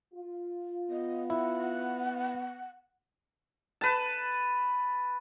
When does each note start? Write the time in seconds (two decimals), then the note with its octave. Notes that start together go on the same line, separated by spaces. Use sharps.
0.14 F4
0.91 B3 D#5
1.30 E4 F#5
3.81 B4 A5